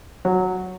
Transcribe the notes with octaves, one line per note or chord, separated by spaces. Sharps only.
F#3